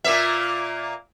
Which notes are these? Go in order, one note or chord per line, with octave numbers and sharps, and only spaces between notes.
A#2 A#3 E5